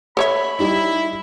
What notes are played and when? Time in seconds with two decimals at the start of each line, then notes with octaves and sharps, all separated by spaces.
0.17 A4 C#5 E5 B5
0.59 G3 D#4 E4